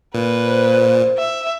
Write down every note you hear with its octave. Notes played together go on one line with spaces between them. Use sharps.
A#2 B4
C5
E5